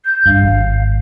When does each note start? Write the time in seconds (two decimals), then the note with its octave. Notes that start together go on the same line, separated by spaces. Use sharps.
0.04 G6
0.26 G2 F5
0.42 G#1